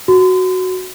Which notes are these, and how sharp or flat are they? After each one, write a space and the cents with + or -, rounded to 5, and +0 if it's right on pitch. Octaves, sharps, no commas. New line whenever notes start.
F#4 +0 C6 -40